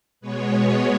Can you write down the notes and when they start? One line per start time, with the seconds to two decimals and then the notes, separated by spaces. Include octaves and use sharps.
0.20 B2 G#3 B3 B4 C#5